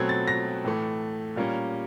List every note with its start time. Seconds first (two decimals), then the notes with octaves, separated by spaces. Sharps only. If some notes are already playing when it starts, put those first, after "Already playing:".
Already playing: B2 F#3 A3 C4 G#6
0.09 A6
0.28 A#6
0.65 A2 E3 A3
1.36 A#2 G3 A#3 C#4